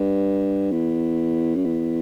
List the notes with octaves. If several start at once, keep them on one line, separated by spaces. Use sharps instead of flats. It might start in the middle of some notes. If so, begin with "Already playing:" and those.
Already playing: G2
E2
F#2
E2